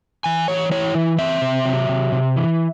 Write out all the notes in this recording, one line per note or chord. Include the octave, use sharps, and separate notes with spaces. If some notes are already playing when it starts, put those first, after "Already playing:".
E3 G#5
E3 C#5
E4 C#5
E3
C4 E5
C3
F#3
C3
C3
E3